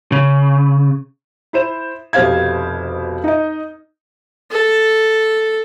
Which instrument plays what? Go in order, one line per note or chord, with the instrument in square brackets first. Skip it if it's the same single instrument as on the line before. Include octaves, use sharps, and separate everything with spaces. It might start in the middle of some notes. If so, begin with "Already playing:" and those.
[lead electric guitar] C#3
[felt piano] E4 C5 E7
F1 B2 G4 C5 F5 G#6
D#4 D#5
[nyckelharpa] A4